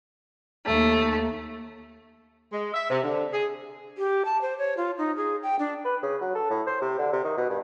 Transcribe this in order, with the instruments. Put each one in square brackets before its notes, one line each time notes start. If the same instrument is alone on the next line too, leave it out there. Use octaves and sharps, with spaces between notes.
[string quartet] D#2 A3
[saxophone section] G#3
E5
C3
D3
G#4
[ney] G4
A5
C5
C#5
F4
D#4
G#4
G5
D4
[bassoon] B4
C#3
F#3
A4
A2
C5
C3
D3
C3
D#3
B2
G2